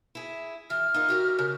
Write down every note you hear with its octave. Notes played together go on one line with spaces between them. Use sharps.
E4 G#4
E3 F6
D#4 F4 A#4
F#4 G4 A#4
C#3